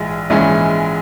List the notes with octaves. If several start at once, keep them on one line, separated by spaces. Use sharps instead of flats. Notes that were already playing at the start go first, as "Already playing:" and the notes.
Already playing: A#1 G#2 E3 G#3
A#1 G#2 E3 G#3 C#4